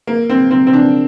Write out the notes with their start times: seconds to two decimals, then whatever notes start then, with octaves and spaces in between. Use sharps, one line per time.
0.07 A#3
0.30 C4
0.51 C4
0.67 C4
0.73 D4